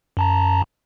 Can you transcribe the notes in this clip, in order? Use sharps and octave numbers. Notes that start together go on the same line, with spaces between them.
F#2 A5 A#5